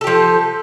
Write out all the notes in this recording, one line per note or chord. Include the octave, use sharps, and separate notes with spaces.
F3 G4 A4